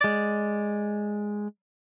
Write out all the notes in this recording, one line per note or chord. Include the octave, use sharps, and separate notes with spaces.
G#3 D5